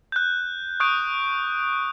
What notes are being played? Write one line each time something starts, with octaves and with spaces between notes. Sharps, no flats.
F#6 G6
C#6 D#6 F#6 G6 D7